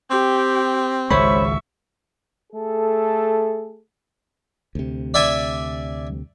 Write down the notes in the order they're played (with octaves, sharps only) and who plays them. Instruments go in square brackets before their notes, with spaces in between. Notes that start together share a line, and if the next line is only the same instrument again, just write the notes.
[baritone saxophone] C4 [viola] G4
[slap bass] G#1 C#2 G#3 [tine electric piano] C5 C#5 B5 [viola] E5 C#6
[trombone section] A3 G#4 A4
[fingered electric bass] D2 C3
[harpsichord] D5 E5 G#5